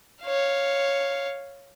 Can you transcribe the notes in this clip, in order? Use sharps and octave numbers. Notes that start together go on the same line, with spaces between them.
C#5 F5